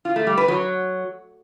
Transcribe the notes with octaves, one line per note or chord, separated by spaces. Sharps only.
F4
A3
G3
B4
F#3